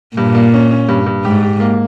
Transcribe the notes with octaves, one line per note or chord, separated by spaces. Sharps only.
G2 A#2
A#3
C#4
C#4
G2
G2
G#2 G4
G4
A#3